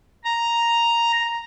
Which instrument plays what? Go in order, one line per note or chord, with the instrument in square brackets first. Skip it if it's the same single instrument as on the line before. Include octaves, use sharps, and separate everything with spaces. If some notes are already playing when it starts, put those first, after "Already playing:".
[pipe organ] A#5